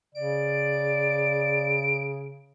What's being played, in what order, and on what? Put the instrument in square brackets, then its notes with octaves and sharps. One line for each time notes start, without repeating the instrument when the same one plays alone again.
[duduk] C#3 [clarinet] D5 [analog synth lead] D7